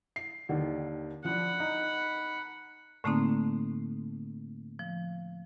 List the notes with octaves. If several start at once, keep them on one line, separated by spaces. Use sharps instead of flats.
C7
D#2 D3 D#3
F3 D4 F#5 B5
D#4
A2 D3 A3 A#3 C4 D#4
F3